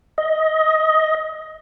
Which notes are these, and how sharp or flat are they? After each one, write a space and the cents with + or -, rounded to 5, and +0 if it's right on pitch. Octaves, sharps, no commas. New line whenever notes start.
D#5 +15